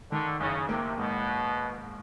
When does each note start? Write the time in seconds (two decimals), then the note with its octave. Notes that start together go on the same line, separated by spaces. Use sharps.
0.12 D3 D#3
0.40 F#1 C#3
0.68 C3 A#3
0.97 G#2 B2